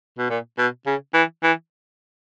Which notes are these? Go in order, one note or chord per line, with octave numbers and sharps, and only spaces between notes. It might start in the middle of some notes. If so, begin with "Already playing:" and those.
B2
A#2
B2
C#3
E3
E3